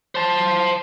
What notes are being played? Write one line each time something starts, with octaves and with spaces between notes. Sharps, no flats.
C5 A5